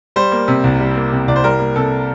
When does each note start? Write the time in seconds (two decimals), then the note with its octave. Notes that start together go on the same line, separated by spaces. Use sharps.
0.16 G3 C5
0.32 A#3
0.48 C3
0.64 C2
0.80 G3
0.96 A#3
1.12 C3
1.27 C2 D5
1.36 C5
1.44 G3 A#4
1.60 A#3
1.76 C3 A4